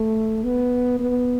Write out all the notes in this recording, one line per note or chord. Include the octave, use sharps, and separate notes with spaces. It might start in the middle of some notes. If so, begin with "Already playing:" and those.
Already playing: A3
B3
B3